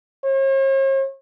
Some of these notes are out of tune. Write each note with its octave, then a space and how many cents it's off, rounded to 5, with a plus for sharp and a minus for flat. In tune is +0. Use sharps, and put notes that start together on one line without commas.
C#5 -45